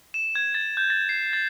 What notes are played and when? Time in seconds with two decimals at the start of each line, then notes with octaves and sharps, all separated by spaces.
0.14 E7
0.35 G#6
0.55 A6
0.77 G6
0.90 A6
1.09 C7
1.33 A6